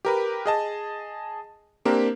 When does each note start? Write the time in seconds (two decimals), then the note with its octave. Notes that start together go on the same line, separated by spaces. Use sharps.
0.05 G4 A#4 B4
0.46 G#4 D#5 A5
1.85 A#3 C4 D4 G4 A#4